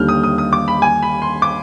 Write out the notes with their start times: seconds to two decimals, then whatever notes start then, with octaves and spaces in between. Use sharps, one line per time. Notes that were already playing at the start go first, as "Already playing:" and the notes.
Already playing: D#2 D3 G3 F6 G6
0.08 D#6
0.23 D#6
0.38 D#6
0.53 D6
0.68 B5
0.82 G#5
1.03 B5
1.22 C6
1.42 D6